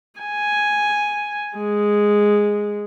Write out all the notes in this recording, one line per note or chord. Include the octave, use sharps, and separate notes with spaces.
G#5
G#3